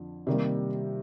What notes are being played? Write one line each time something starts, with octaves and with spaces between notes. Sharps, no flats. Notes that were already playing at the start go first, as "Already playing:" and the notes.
Already playing: F2 D3
C3 D#3 G3 A#3